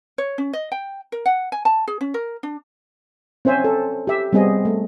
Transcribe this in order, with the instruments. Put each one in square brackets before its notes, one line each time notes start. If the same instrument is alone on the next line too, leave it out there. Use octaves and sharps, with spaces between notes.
[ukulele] C#5
C#4
D#5
G5
A#4
F#5
G#5
A5
G#4
C#4
A#4
D4
[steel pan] C4 C#4 C5 E5 G#5
A4
G4 E5
G3 B3 C4 G#4 D#5
A3